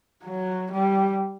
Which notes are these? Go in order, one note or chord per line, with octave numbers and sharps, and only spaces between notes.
F#3
G3